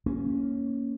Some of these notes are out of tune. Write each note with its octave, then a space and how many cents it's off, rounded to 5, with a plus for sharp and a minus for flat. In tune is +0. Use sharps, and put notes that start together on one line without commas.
A#3 +0 C#4 +0